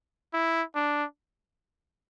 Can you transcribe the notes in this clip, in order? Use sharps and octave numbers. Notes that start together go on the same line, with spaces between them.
E4
D4